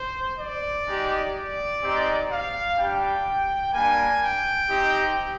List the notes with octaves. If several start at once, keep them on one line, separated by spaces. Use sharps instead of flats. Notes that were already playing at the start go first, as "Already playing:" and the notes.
Already playing: C5
D5
G#3 D#4 G4
D5
G#3 C4 D#4 G4
F5
G3 D4 G4 G5
G3 A#3 D4 G#5
G5
C4 D#4 G4